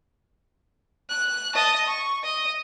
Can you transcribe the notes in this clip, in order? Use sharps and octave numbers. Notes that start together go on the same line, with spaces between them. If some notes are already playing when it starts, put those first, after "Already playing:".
F#6
D#5 A5
C#6
D#5